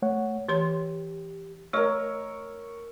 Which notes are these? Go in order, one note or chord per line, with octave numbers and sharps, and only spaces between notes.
A3 C#5 F#5
E3 G4 C#5 C6
A3 A#4 C#5 D#5 E6